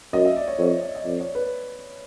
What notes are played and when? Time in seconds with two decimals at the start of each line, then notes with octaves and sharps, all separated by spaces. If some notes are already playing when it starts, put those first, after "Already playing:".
0.13 F#2 D#5
0.25 E5
0.36 D5
0.48 C#5
0.58 F2 C#5
0.81 D#5
0.95 D#5
1.05 F2 D5
1.20 C#5
1.35 B4